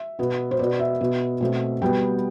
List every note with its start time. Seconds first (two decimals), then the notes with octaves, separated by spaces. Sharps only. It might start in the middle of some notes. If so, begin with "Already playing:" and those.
Already playing: E5
0.19 B2 B3
0.51 C5
0.59 B2 B3 D5
0.79 E5
1.01 B2 B3
1.41 B2 A3 C4
1.82 B2 G3 B3 G5